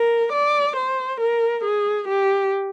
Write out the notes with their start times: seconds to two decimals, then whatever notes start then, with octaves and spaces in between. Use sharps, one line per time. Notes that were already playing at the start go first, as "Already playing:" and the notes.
Already playing: A#4
0.33 D5
0.77 C5
1.21 A#4
1.65 G#4
2.08 G4